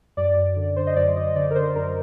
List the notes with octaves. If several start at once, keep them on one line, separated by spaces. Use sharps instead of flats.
F#2 D5
F#2
D3
D3 C5
D#5
F#2 D5
F#2 D#5
D3 D5
A#4
D3 C5
F#2 A#4